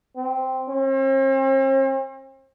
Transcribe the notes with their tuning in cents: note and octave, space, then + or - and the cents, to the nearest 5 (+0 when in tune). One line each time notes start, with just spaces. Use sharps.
C4 -5
C4 +45